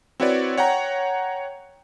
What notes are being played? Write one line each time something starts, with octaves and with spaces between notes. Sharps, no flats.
C4 E4 F#4 B4 C#5 D5
C#5 F#5 G5 A#5